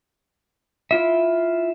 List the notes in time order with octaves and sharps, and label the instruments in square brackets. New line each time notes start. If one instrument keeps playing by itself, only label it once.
[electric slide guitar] E4 F4 E5